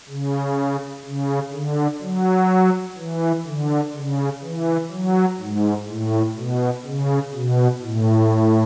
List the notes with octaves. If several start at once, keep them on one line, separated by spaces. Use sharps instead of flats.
C#3
C#3
D3
F#3
E3
D3
C#3
E3
F#3
G#2
A2
B2
C#3
B2
A2